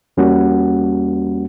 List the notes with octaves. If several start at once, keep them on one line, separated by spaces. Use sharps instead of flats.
E2 G3 A#3 C#4 F#4 F#5